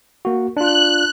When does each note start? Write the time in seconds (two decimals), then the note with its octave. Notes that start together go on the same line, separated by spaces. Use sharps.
0.25 A#3 F#4
0.57 D4 F4 F#6